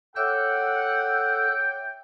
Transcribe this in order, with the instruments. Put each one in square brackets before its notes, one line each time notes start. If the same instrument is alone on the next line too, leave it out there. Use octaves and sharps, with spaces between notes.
[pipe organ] A4 E6 F#6 [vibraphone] C#5 E5 D6 [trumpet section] F#5 [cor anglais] G5